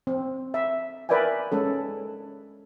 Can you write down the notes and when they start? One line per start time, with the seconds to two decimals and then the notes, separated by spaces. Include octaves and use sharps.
0.07 C4
0.54 E5
1.09 A#4 B4 D5 E5 G5 G#5
1.52 G#3 C#4 A4